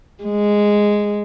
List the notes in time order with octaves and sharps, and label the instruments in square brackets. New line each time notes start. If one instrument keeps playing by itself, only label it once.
[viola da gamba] G#3